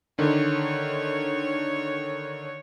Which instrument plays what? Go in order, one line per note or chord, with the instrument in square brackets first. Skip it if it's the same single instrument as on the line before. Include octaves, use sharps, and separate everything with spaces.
[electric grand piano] D3 D#3 [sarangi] C#5